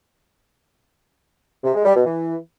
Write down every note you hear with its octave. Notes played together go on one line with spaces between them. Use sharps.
C3
G#3
G3
B2
E3